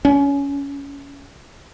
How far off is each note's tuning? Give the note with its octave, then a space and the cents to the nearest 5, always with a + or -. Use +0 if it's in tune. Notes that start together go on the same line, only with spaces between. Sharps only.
C#4 +20